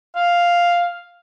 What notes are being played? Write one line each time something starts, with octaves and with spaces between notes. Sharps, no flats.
F5